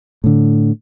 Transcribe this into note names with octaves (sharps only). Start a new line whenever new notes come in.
A2 D3